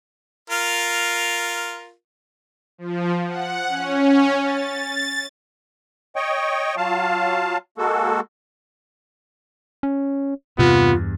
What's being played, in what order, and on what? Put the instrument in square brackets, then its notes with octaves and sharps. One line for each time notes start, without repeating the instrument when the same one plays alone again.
[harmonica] F4 A#4
[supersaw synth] F3
F#5
C#4
A6
[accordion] C#5 D#5 G5 C#6
F#3 F4 F5 A5
G#3 A#3 F#4 A4
[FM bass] C#4
[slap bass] E2 G2 [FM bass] C3 [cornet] B3 [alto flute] F4